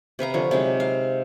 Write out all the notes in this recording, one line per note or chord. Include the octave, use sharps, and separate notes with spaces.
C3 B4 F5 A#5
D3 F3 C#5
C3 F#3 G#3 D#4
F5